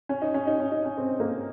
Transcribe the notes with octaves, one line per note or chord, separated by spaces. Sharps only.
C#4
D#4
C#4
D#4
C#4
D#4
C#4
C4
A#3